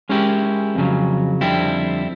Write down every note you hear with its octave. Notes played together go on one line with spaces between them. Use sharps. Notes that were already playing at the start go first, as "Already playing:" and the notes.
G#3 C#4 E4 G4 A#4
F2 C#3 F#3
F2 D3 G3 C4 E4